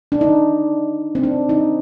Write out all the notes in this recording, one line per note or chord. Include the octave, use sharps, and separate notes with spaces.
D4
D#4
C4
D4
D#4